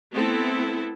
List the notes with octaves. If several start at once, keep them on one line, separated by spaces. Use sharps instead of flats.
A3 B3 C4 E4 A4